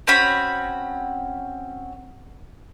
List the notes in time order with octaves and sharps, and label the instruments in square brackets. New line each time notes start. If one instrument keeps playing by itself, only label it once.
[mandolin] C4 C#4 F#4 B5